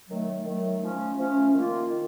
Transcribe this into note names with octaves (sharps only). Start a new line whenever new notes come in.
D#3 F#3 A3
D#3 F#3 A3
F3 A3 C#4
F3 A3 C#4
D#3 A#3 F4
D#3